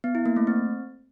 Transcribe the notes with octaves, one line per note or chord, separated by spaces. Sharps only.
B3
E4
A#3
A3
C4